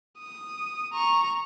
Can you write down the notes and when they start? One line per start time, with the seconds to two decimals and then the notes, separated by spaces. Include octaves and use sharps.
0.20 D#6
0.93 A#5 C#6